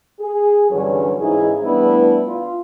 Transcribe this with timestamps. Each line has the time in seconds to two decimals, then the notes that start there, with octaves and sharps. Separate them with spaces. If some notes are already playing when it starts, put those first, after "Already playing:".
0.20 G#4
0.70 G2 D3 E3 F#3 G3 C#4
1.21 G#2 C#3 E3 D#4 E4 G#4
1.62 E3 G3 A3 B3 D4 E4
2.27 F4